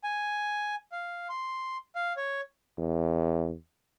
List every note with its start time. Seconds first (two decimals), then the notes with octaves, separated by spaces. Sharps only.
0.04 G#5
0.92 F5
1.29 C6
1.96 F5
2.17 C#5
2.78 E2